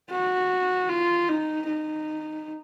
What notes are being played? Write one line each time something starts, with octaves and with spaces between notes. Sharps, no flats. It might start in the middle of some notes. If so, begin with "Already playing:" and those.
F#4
F4
D#4
D#4